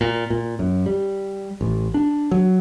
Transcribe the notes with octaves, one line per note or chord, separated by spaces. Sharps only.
A#2
A#2
F#2
G3
A1
D4
F#3